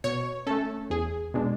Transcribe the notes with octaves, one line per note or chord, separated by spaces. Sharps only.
B2 C#5
A3 C#4 A4
E2 G#4
B2 G#3 D4